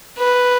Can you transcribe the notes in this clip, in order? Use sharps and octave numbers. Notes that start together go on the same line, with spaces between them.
B4